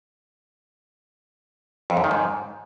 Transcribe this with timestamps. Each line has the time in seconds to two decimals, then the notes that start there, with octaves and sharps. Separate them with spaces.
1.90 F2
1.97 F#2
2.04 D#3
2.11 G#2